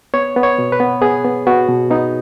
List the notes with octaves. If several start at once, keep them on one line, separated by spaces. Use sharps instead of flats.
B3 C#5
B3
C#5
B2
B4
B3
B3 G#4
B3
B3 F#4
B2
B3 D#4